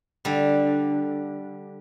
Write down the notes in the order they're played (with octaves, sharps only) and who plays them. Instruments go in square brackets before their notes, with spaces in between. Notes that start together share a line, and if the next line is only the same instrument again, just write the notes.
[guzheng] D3 G3